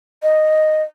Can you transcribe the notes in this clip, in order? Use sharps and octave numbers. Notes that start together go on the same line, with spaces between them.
D#5